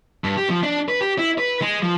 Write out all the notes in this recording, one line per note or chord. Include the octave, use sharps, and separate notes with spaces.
G2
G4
F3
D4
B4
G4
E4
B4
G#3
F3